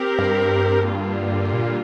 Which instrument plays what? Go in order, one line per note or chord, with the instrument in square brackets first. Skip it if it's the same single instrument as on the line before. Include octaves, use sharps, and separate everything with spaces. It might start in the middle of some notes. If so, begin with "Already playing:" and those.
Already playing: [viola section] C4 G4 A#4
[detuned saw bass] G2
[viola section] D3 G3 A#3 F4
[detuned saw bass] A#2